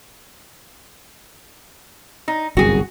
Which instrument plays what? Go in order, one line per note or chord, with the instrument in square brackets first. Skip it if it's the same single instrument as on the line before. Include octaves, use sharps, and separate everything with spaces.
[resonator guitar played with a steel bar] D#4
[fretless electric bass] G1 C2 F#2 [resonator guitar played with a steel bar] F#4 G#4